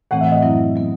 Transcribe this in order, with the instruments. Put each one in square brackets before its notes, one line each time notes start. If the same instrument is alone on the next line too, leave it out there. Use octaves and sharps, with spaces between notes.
[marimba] A2 E3 A3 C4 [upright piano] F#5
[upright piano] E5
D#5
[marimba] F#2 F#3 C4 E4
F#3 B3